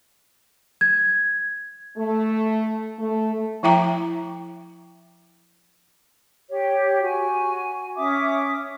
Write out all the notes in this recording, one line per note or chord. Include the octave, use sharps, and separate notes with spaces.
G#6
A3
A3
F3 E4 E5 G5 A#5 D6
G4 C#5
F#4 G#5
C#4 E5 D6 D#6